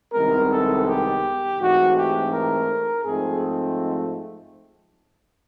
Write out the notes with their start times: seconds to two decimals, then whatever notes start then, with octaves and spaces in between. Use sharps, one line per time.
0.13 C2 C3 D#3 G#3 B3 A#4
0.50 A4
0.86 G4
1.58 G#2 E3 A3 C4 F#4
1.95 G4
2.31 A#4
3.04 G#2 F3 A3 C4 G#4